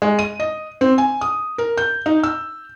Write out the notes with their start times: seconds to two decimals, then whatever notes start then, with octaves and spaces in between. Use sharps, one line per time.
0.02 G#3
0.19 D#7
0.40 D#5
0.81 C4
0.98 G#5
1.21 D#6
1.58 A#4
1.77 G6
2.06 D#4
2.23 E6